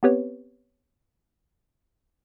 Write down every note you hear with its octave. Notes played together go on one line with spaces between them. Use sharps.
B3 C4 G4 B4 C#5